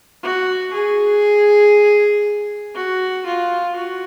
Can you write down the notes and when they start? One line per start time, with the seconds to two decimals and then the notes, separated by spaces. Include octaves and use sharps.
0.23 F#4
0.73 G#4
2.75 F#4
3.26 F4
3.75 F#4